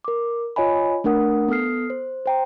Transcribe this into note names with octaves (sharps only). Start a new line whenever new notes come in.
A#4 D6
F4 C#5 D#5 G#5 B5
A3 D4 A#4 F#5 D#6
B3 A4 D#6 F6 C7
C5
C5 G5 A#5